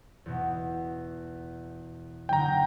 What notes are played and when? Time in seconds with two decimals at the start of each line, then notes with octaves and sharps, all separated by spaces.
0.26 E2 B2
2.29 F#1 D3 G5 A#5